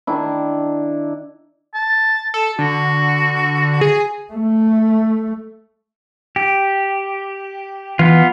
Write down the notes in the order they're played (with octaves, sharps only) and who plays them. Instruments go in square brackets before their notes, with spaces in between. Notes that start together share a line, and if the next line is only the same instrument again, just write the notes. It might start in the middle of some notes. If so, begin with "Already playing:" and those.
[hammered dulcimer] D#3 D4 E4
[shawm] A5
[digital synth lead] A4
[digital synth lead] D3 [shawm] F#4
[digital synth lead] G#4
[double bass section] A3
[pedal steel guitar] G4
[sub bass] E3 [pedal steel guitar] B3 F4